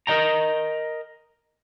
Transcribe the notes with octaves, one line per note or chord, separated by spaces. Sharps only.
A#4 B4 D#5 G5 A#5